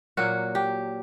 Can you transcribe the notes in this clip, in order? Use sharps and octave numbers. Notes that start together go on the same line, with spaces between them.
A#2 F#3 A#3 F#4
G4